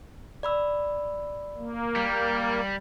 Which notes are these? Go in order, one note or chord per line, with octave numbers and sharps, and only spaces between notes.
D5 B5 E6
A#3
G3 G6